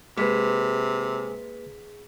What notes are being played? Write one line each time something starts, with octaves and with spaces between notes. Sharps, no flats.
C3 G#3 A#3 G#4 B4 B6